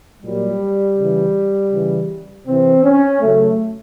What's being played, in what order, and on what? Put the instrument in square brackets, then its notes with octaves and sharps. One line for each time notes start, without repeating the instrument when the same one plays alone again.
[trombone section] A#2 F#3 G3
C#3 E3
C#3 E3
C3 E3 C4
C#4
C#3 F#3 A3